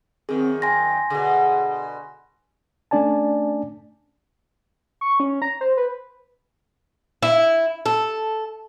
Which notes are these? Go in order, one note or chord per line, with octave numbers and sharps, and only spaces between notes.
F#2 D#3 C4 G#4
G5 G#5 C6 A#6
B2 D3 G#4
A3 C#4 D4 D5 G#5 A5
C#6
C#4
A#5
C5
B4
E4
A4